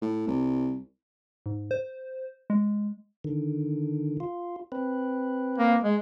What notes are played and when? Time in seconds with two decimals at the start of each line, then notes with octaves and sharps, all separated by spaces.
0.02 A2
0.28 C2
1.46 G#2
1.71 C5
2.50 G#3
3.24 D3 D#3
4.20 F4
4.72 C4 B4
5.58 A#3
5.84 G#3